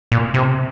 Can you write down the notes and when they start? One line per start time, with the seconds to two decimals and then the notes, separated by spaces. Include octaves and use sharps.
0.12 A#2
0.34 C3